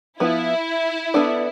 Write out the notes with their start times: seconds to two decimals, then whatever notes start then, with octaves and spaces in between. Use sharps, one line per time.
0.20 F3 B3 E4 F4
1.14 B3 D4 A4 D5